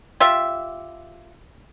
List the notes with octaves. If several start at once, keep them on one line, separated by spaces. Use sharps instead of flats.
F4 G4 E5